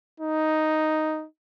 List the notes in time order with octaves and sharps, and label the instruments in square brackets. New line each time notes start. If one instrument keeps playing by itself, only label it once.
[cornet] D#4